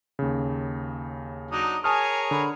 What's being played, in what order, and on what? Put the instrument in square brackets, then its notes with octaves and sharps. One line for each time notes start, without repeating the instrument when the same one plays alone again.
[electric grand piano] D#2 C#3
[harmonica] F#3 D4 D#4 [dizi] D#6
[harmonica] G#4 A#4 C#5 [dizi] G#5 [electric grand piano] A5 D#6 F6
[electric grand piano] D3 [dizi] B5